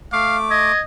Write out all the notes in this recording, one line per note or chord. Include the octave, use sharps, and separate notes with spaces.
A3 F5 D6
D#5 G#6